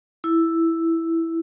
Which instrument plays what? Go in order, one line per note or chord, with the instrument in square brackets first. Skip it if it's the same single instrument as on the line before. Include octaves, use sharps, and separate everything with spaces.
[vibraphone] E4